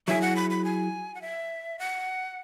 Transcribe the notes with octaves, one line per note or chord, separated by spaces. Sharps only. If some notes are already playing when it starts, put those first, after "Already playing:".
F#3 E4 G#4 E5
F#5
B5
B5
G#5
F#5
E5
F#5